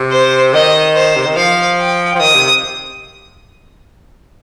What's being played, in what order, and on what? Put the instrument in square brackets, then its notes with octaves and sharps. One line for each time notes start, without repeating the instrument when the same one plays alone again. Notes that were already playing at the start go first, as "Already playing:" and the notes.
Already playing: [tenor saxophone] C3
[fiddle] C5
[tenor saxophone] D#3 [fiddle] D#5
[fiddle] C5
[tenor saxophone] C3
D#3
[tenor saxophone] F3 [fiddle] F5
[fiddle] G5
[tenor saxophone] F3
[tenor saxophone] D#3 [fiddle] D#6
[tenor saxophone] C3